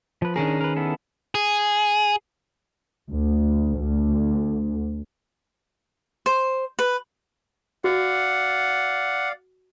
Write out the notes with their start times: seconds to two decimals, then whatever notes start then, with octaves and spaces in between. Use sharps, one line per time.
0.22 F3 B4
0.36 D#3 C#4 D4 G#4 A#4
0.61 A#4 B4
0.76 B3 E4 A4
1.35 G#4
3.09 D2
3.78 D2
6.26 C5
6.79 B4
7.84 F#4 D5 F5 F#5